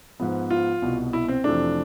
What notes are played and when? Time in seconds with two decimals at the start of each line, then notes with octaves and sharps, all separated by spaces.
0.20 G#2 F3 B3
0.50 F4
0.82 C2 B2 B3
1.13 E4
1.28 C4
1.44 F2 C3 E3 A3 D4